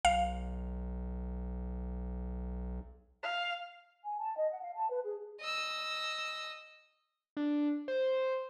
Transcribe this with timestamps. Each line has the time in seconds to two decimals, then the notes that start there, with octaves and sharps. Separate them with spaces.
0.05 B1 F5
3.23 F5
4.05 G#5
4.19 A5
4.37 D#5
4.51 F#5
4.63 F5
4.76 A5
4.91 B4
5.04 G#4
5.40 D#5 E6
7.37 D4
7.88 C5